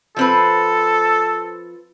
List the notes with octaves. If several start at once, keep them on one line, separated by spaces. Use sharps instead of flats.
F3 C4 A4 B4